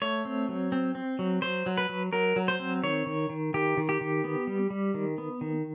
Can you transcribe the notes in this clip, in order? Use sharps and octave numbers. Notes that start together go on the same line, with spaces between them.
A3 C#5
C4
F#3
C4
C4
F#3
F#3 C5
F#3
B4
F#3
F#3 A#4
F#3
C5
C4
D#3 C#5
D#3
D#3
D#3 G4
D#3
G4
D#3
B3
G3
G3
D#3
B3
D#3